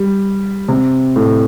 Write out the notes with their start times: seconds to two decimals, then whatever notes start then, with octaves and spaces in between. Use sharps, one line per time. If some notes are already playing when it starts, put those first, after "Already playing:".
Already playing: G3
0.68 C3
1.16 A2